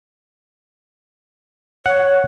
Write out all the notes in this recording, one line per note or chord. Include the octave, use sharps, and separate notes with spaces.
C#5 F#5